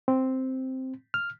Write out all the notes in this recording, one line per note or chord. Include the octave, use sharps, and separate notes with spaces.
C4
F6